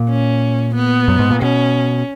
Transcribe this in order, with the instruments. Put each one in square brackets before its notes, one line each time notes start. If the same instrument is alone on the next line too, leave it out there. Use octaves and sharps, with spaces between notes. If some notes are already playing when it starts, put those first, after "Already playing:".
Already playing: [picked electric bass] A#2
[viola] C#4
B3
[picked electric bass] F#2
G#2
A#2
[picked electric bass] B2 [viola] C#4